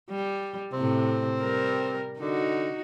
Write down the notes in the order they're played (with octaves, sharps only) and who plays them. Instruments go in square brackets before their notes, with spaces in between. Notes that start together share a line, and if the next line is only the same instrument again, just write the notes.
[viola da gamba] G3
[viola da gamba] A2 C3 [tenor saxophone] C4
[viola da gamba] G3 A#4
[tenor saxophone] D3 [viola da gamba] D#4 F#4